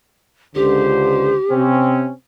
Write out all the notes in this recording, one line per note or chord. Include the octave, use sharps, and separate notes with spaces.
C#2 D3 G4 C5
C3 C4 C#4